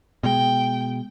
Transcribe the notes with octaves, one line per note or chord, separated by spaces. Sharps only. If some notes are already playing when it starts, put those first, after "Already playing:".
B2 G#3 G5